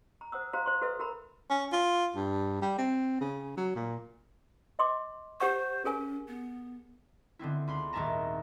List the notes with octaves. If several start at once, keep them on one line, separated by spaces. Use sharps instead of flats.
A#5
C5 F#5 D#6 E6
F#4 C5 F5 A#5
C5 C6
F#4 A4 B4 E5
F#4 A#4 A#5 B5
C#4
F4
G2
G3
C4
C#3
F#3
A#2
D#5 C6 D6
G4 C5 F#5 C#6
C#4 G#4 A#4 G#5
B3
D3 B3 C4 E4
C#2 B5 C6
D#1 G#1 D#2 E5 A5 A#5